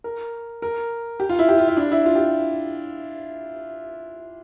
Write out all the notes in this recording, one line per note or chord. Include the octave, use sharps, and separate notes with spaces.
A#4
A#4
G4
F4
E4
G4
F4
E4
D4
E4
F4
G4